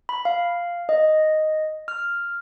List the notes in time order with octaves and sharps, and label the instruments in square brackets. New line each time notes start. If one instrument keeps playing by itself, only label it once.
[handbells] B5
F5
D#5
F6